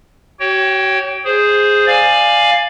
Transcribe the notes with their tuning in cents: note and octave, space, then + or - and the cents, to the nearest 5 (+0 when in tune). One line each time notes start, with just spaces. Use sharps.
F#4 +45 C#5 +0 G5 +0
G#4 +0 C5 +0
D5 +15 F5 +0 G#5 +0